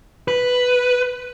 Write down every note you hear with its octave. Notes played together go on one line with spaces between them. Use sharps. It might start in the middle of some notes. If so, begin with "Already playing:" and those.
B4